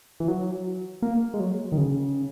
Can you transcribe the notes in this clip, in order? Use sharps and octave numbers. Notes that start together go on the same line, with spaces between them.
E3
F#3
A#3
G#3
F#3
D#3
C#3